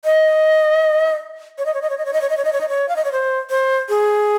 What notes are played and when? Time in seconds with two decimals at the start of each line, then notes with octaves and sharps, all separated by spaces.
0.05 D#5
1.58 C#5
1.66 D#5
1.74 C#5
1.82 D#5
1.90 C#5
1.98 D#5
2.05 C#5
2.13 D#5
2.21 C#5
2.29 D#5
2.37 C#5
2.45 D#5
2.53 C#5
2.61 D#5
2.69 C#5
2.89 F5
2.96 D#5
3.05 C#5
3.12 C5
3.50 C5
3.89 G#4